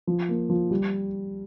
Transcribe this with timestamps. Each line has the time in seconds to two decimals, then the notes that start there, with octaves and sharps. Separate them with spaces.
0.07 F3
0.29 A#3
0.50 F3
0.71 G3